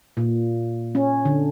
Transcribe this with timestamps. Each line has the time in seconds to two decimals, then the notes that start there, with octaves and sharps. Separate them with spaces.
0.17 A#2
0.95 C#4
1.25 D3